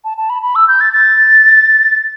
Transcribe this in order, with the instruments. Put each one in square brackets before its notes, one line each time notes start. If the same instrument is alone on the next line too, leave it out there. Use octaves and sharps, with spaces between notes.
[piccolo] A5
A5
B5
B5
E6
G6
A6
A6